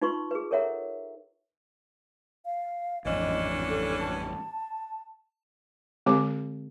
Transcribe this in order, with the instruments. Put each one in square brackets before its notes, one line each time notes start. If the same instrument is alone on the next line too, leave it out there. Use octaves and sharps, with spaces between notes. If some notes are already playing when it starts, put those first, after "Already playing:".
[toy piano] D#4 F4 B4 C6 C#6
G#4 B4
A4 A#4 C#5 E5 F#5 A#5
[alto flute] F5
[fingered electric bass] A1 F2 G#2 [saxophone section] E3 C#4 D4 [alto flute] D#5
[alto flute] A4
A5
[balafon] D3 G#3 C4 G4 C#5 D6